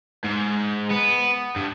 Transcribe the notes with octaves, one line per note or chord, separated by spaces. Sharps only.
G#2
B3
G2